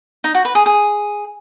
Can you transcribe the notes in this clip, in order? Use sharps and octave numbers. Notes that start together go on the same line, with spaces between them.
D#4
F#4
B4
G#4
G#4